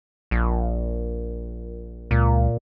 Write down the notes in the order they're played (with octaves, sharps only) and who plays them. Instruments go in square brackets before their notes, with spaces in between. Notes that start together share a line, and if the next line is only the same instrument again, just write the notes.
[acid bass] A#1
[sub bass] C#2 [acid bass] A#2